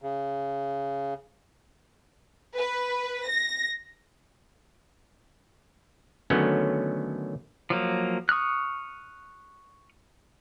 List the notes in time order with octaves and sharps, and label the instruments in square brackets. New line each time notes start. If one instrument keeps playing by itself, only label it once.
[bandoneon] C#3
[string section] B4
A#6
[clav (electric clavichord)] D3 D#3 F#3 A3 B3 C#4
[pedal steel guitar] F3 F#3 A#3
C#6 D#6 F6 F#6